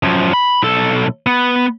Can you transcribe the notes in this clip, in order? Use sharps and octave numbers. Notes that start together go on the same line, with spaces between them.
F#2 F3
B5
B1 A4
B3